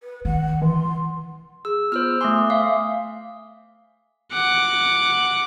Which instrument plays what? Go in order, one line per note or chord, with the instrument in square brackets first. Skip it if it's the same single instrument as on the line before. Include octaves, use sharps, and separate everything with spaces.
[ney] B4
[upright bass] D#3 [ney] F#5
[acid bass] E3 [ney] C6
[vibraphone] G#4 [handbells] E6
[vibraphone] B3 F4 [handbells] C5 E6 F6
[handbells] A3 C6 [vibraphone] G#5 D6 D#6
[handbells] E5 F5
[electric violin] F#5 D6